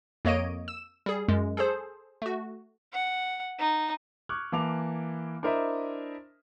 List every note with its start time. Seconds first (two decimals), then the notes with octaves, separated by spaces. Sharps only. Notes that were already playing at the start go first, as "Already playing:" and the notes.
0.25 F2 A#3 C#5 D#5 D7 D#7
0.68 E6 E7
1.06 G3 G#4
1.28 F#2 G#3
1.57 G#4 A4 C5
2.22 A3 F#4
2.93 F#5
3.59 D#4
4.29 C#6 D6 F6 F#6 G#6
4.52 E3 A#3 A5 D6 F7
5.43 D4 E4 A#4 C5 D#5 E5